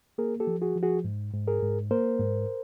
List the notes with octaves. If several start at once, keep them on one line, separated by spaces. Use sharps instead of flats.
A#3 G#4 A#4
G4 A4
F3
F#4 G#4
F3
F#4 G#4
G#2
G#2
G#4 A#4
G#2
A#3 A#4 C5
G#2